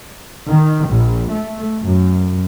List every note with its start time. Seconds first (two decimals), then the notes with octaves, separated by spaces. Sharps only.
0.50 D#3
0.89 A#1
1.33 A3
1.84 F#2